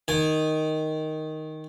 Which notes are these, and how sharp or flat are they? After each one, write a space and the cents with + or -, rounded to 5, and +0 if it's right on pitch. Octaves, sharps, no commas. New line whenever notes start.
D#3 +0 G#5 -15